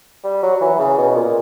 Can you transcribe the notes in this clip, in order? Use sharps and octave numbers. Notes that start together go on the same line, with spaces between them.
G3
F#3
F#3
E3
C#3
B2
A#2